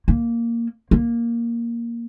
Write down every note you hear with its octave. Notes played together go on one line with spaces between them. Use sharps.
A#3
A#3